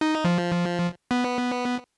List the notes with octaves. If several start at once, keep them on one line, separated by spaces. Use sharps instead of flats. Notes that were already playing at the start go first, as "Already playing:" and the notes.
D#4
F3
B3